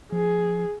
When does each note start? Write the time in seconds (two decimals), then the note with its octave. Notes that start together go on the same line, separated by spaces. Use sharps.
0.12 F3 G#4